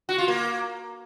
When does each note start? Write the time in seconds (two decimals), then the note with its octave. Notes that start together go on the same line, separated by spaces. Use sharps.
0.09 F#4
0.18 F4
0.28 A#3